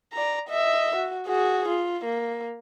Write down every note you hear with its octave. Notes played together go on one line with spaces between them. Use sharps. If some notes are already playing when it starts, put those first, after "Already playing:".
D5 A#5
D#5 E5
F#4
F#4 G#4
F4
A#3